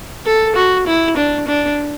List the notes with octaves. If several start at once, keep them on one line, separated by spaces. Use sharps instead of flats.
A4
F#4
E4
D4
D4